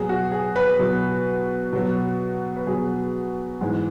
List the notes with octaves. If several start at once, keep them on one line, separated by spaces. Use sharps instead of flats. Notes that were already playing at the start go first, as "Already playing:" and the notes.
Already playing: B2 F#3 G#4
F#4
G#4
B4
B2 F#3
B2 F#3
B4
B2 F#3 G#4
G#2 E3 G#3